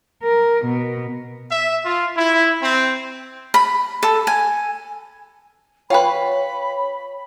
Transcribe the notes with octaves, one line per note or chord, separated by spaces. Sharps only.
A#4
B2
E5
F4
E4
C4
B5
A4
G#5
F4 B4 C#5 F#5 G5 B5 C6